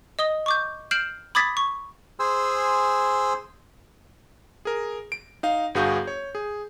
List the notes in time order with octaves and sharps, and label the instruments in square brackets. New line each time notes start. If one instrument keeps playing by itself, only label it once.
[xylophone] D#5 D#6 G7
C#6 D6 G6
F6 G6 C7 D7 E7 F#7
B5 D6 D#6 G#6 A6 B6
C#6
[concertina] G#4 C5 G#5 C6 E6
[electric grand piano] G#4 A#4
D7
D#4 F5
G1 G2 F#4 G#4 F5 G6
C#5
G#4